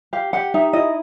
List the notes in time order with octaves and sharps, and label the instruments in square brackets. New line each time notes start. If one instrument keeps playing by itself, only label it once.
[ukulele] G4 F5
G4 F#5
D#4 E5
E4 D#5